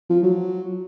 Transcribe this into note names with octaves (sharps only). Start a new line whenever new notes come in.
F3
F#3